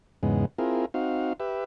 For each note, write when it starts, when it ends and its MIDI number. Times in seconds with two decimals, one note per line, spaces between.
0.23 0.45 40
0.23 0.45 44
0.23 0.45 49
0.23 0.45 56
0.23 0.45 59
0.58 0.86 60
0.58 0.86 64
0.58 0.86 65
0.58 0.86 68
0.58 0.86 70
0.94 1.33 60
0.94 1.33 63
0.94 1.33 66
0.94 1.33 77
1.40 1.64 67
1.40 1.64 71
1.40 1.64 76